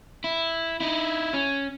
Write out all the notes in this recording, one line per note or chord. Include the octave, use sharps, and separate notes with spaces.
E4
D#4 E4
C#4